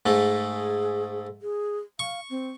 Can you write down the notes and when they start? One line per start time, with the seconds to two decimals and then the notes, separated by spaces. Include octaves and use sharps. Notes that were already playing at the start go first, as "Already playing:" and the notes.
0.06 G#2 A3
0.31 G#4
1.42 G#4
1.99 F5 C#6
2.30 C4